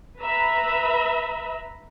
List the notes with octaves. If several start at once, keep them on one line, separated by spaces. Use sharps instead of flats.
B4 E5 A#5 B5